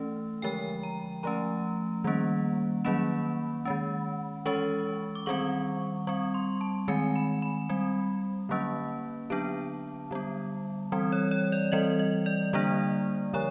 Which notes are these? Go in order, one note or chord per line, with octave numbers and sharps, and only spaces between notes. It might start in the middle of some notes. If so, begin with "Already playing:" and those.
Already playing: E3 A3 C#4
D3 F3 G#3 G5
A#5
F3 A3 C#4 A#5
D#3 G3 A#3 C#4
D#3 F#3 A#3 C#4 B5
D#3 G#3 C#4
E3 G#3 C#4 C#6
D6
D#3 G3 C4 C#6
G3 C4 C#6
C6
A5
D#3 G#3 C4 G#5
B5
B5
G3 C4
D3 F#3 A#3 C#4
D3 F#3 B3 D4 A5
D3 G3 B3
E3 G3 C4
C#5
C#5
D5
E3 G3 C4 D#5
D#5
D5
D3 G3 A#3 D4
D3 F3 C#5